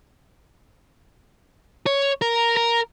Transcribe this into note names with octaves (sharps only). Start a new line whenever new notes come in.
C#5
A#4
A#4